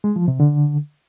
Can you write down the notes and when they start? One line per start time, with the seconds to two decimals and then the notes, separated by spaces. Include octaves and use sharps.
0.04 G#3
0.16 F3
0.28 C3
0.40 D3